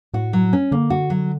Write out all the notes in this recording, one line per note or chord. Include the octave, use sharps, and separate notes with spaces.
A2 F#4
F#3
C#4
D3 A#3
F#4
F#3